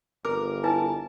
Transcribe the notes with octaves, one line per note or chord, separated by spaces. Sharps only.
G1 A#4 D6
E4 B4 G#5 A5